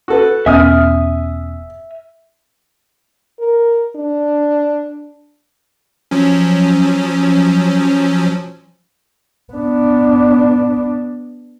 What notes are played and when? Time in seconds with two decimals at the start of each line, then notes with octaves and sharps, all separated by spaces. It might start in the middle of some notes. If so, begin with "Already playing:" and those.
0.08 F#4 A4 B4
0.46 E1 B3 C#4 E5 G#5 D#6 F6
3.39 A#4
3.96 D4
6.11 F3 F#3 C#4
9.54 B3 D4